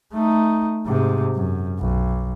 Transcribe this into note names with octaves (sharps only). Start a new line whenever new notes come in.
A3 D#4
G#2 C3
F#2
B1